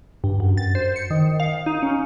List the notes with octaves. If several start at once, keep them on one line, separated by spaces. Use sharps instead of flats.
G2
F#2
A6
C5
C#7
D#3
F5
D#4
C#4